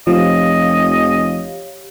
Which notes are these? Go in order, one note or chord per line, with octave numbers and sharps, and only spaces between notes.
F1 F3 G4 C#5 D#5 F5